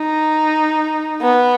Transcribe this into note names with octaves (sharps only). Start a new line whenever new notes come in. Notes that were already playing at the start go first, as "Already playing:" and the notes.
Already playing: D#4
B3